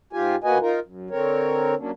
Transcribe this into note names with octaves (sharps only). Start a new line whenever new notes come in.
G#2 F4 G4 G#5
D2 A#3 F#4 B4 D#5 G#5
D#4 F4 A#4
F#2
D3 C4 A#4 C#5
F#3 A#3 C#4 D4